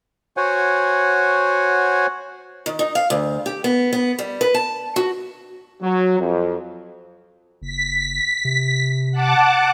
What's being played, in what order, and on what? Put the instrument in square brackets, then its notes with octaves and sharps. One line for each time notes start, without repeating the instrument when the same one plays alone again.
[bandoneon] F#4 C5 C#5 F#5 G#5
[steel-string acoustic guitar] D#3
D#4
F5
D2
G4
B3
B3
G3
B4
A5
F#4
[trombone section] F#3
F2
[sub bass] F#1 [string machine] B6
[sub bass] C3
[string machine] F#5 A5 D6